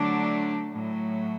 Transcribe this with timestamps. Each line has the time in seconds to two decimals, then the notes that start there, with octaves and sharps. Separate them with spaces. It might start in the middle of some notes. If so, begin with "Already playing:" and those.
Already playing: D3 F#3 A3 D4
0.72 A2 F#3 A3